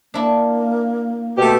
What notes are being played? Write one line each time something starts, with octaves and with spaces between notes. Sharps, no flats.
A#3 D4 E4
B2 A3 G4